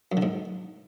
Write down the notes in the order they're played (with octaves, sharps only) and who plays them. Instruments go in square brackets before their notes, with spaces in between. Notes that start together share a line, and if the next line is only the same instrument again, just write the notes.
[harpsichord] F#2
D3
G#2